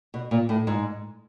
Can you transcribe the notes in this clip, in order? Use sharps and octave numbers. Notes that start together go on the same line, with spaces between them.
B2
A#2
A2
G#2